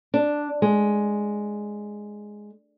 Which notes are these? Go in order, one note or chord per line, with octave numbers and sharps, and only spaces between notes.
D4
G#3